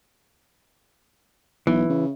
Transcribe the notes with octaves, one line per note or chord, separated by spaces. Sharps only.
B1 E3
C#3